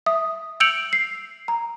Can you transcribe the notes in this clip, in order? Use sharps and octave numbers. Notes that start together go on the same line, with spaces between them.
E5 D#6
E6 G6 C#7 D7 F7 F#7
C7
A#5